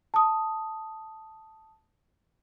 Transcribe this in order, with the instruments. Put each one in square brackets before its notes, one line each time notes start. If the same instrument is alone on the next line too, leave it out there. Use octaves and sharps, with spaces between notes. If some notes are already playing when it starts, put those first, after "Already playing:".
[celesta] A5 D#6